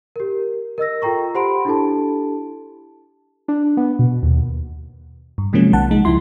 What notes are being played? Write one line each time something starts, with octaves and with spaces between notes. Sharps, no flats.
G4 A#4
A#4 D#5 E6 A#6
F4 A4 G5 A#5 C#6
G4 C5 F#5 B5 C6 D7
D4 E4 G4 A4 A5
D4
B3
B2
D#2
G2
C3 F3 F#3 G#3 A#3 C#4
B1 D#3 F#5 A5
G#3 D#4
C#2 F3 E4 C6